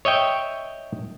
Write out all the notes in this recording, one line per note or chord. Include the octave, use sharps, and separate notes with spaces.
C#5 D#5 E5 G5